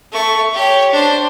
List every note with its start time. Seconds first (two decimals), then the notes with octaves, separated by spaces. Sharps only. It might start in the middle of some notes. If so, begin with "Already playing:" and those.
0.12 A3 C#6
0.54 G4 C#5
0.91 D4 C5